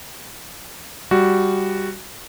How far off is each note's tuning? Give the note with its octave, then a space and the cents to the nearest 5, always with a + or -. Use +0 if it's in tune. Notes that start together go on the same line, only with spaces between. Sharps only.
G3 +5 F#4 +0